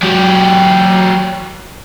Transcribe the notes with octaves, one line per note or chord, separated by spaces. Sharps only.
F#3 G4